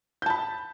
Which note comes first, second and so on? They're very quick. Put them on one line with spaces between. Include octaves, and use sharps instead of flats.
G6 A5 B5